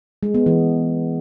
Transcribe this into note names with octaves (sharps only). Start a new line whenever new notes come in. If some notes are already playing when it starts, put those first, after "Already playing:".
G#3
B3
E3